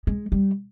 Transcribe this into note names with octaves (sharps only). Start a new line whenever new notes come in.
G#3
G3